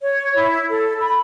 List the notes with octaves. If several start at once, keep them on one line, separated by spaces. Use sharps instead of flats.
C#5
E4
A4
B5